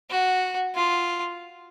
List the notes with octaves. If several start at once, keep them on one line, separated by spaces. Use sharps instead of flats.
F#4
F4